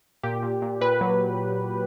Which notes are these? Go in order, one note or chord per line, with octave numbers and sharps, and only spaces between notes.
A#2 G4
A#2
A#2
A#2 B4
F#3